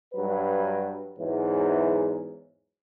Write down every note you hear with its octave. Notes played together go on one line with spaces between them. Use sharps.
G2 F#3 B4
E2 G#2 E3 F#3